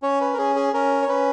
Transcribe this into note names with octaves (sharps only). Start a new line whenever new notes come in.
C#4 C#5
B4
A#4
C#4 G#4
G#4
C#4 A#4
C#5
C#4 B4